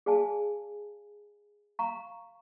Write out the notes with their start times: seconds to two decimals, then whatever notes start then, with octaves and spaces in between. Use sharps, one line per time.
0.06 G#4 D5 F5 G#5 A5
1.79 F5 A#5 C#6